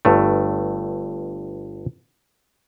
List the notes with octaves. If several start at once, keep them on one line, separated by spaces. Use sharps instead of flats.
G1 G2 A3